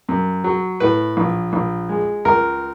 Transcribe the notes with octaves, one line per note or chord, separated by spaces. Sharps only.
F#2
F#3
A2 B4
A#1
A#1
G#3
C#2 A#4